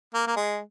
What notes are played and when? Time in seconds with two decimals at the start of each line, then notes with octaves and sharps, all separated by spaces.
0.14 A#3
0.27 A#3
0.36 G#3